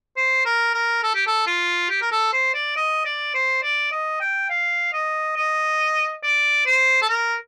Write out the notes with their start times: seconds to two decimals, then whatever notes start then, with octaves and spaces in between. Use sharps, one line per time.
0.16 C5
0.45 A#4
0.74 A#4
1.03 A4
1.15 G4
1.26 A4
1.46 F4
1.90 G4
2.01 A#4
2.12 A4
2.33 C5
2.54 D5
2.76 D#5
3.05 D5
3.34 C5
3.63 D5
3.92 D#5
4.21 G5
4.50 F5
4.93 D#5
5.36 D#5
6.23 D5
6.66 C5
7.02 A4
7.09 A#4